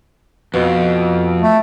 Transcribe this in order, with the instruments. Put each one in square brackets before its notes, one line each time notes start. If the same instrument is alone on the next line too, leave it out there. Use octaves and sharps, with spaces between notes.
[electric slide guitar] F2 [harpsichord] B2
[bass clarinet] A3